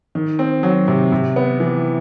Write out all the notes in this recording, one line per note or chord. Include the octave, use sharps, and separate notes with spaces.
D#3
C4
F#3
C3
C3
B3
E3